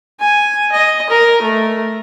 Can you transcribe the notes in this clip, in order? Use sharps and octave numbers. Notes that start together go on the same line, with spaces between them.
G#5
D#5
A#4
A3